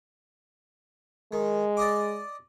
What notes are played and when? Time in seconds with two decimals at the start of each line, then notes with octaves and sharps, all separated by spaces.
1.32 D#3 G#3
1.77 D5 D#5 D6